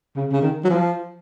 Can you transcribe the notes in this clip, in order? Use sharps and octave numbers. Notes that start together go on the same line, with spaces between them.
C#3
C#3
D#3
F#3
F3